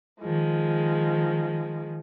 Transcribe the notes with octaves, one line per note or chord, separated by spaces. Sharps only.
D#3 F3 G#3